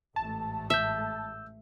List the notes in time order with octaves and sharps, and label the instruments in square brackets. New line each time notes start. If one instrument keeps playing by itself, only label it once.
[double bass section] A1 G#2 A3 [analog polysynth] A5
[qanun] E5 [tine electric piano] E6 G6